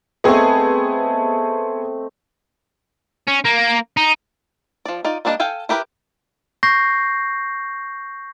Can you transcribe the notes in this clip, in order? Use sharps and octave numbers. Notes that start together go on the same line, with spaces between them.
A3 B3 C4 G#4 D#5
C#4
A#3
D#4
F3 D5
D#4 F4 D5
G3 A#3 D4 D5 D#5
A4 F5 G5 G#5
E4 G4 A#4 B4
C#6 G6 A#6 C7